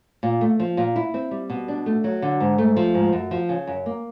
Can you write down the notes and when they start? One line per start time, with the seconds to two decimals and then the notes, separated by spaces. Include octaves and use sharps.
0.23 A#2
0.41 A3
0.60 F3
0.77 A#2
0.96 E4
1.14 C4
1.31 G3
1.50 B2
1.68 D4
1.86 A3
2.04 F#3
2.22 D3
2.40 G#2
2.58 A3
2.76 F3
2.94 G#2
3.13 F#2
3.31 F3
3.49 C#3
3.67 F#2
3.86 A#3